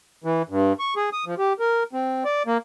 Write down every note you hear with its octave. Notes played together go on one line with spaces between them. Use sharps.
E3
G2
C#6
G#4
D#6
F3
G4
A#4
C4
D5
A#3